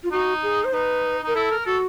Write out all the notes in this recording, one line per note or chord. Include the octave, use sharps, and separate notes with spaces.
F4
D#4 F#4
G#4
C5
D#4 B4
D#4 A#4
E4 A4
A#4
F#4 A4